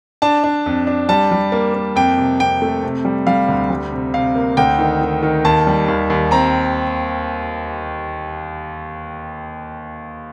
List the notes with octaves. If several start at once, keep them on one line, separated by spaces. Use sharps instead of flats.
D4 A5
D4
F2
D4
G3 A5
G3
A#3
A#3
F2 G5
C3
F2 G5
A3
C3
G3
G3 F5
D2
G3
C3
C3 F5
A#3
D2 G5
D#3
D#3
D#3
D#2 A5
G3
D#2
D#2
C4 A#5